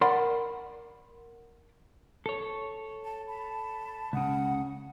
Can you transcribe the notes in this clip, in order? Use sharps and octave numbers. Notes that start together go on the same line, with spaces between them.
A#4 D5 F#5 B5 C6
A4 C#5
A5
A5 B5
C#2 C#3 F#5 D#6